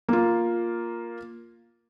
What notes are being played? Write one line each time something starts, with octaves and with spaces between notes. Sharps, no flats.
A#3 F4